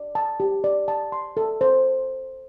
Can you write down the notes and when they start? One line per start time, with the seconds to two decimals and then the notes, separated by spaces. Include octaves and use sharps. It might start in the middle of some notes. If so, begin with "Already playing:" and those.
Already playing: D5
0.15 A5
0.40 G4
0.64 D5
0.88 A5
1.12 C6
1.37 A4
1.61 C5